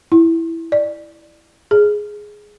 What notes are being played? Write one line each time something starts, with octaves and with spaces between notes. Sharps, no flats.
E4
D5
G#4